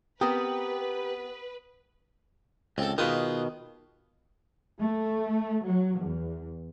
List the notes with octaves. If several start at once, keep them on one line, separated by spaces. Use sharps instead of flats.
B3 C4 G4 A#4 B4 D#6
C#2 C4 A4
B2 D#3 F4 G#4 B4
A3
F#3
E2